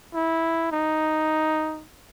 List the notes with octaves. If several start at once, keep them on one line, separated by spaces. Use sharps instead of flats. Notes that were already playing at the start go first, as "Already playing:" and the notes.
E4
D#4